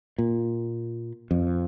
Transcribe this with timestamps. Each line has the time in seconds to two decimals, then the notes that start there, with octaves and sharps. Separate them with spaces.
0.18 A#2
1.31 F2